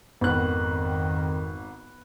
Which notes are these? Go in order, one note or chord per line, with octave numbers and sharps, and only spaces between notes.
G#1 F2 D#3 B3 F#6